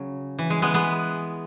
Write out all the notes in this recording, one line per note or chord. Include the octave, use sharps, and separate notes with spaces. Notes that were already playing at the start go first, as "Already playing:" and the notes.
Already playing: C#3 F#3
E3
G#3
G#3 B3
G#3 B3